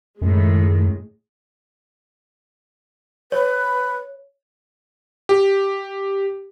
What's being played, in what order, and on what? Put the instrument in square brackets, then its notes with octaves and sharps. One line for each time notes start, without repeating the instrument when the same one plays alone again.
[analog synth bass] F#2 [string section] A2 D#3 G#3
[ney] B4 [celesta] C#5
[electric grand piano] G4